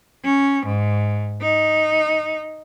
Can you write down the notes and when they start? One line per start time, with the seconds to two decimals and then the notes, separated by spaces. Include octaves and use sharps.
0.24 C#4
0.66 G#2
1.42 D#4